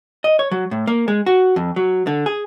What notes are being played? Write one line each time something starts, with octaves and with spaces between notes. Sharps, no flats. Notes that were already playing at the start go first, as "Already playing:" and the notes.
D#5
C#5
F#3
A2
A#3
G#3
F#4
F2
F#3
D3
G#4